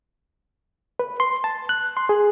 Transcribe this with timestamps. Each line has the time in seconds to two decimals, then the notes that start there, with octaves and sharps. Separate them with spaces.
0.99 B4
1.20 C6
1.44 A5
1.69 F#6
1.97 C6
2.09 G#4